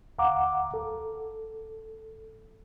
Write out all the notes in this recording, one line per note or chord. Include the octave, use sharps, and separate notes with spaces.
D2 F5 F#5 A#5 D6
A4